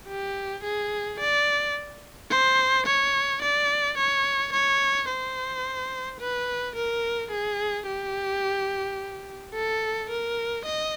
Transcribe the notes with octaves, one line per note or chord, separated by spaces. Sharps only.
G4
G#4
D5
C5
C#5
D5
C#5
C#5
C5
B4
A#4
G#4
G4
A4
A#4
D#5